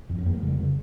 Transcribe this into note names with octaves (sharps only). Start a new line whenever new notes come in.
F2
C#4
F2 A#3
A3
C#3 G3
C#3 G3